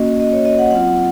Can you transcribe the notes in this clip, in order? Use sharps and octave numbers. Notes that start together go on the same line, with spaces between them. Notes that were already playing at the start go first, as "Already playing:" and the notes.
Already playing: A#3 C#4 F#4 D#5
D#5
C#5
D#5
F#5
F#3 C4 F4 F#5